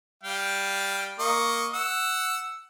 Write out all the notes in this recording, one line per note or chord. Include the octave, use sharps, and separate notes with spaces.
G3 F5 G5
A#3 D#5 C#6
F#5 E6